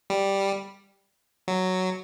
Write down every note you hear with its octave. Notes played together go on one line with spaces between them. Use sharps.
G3
F#3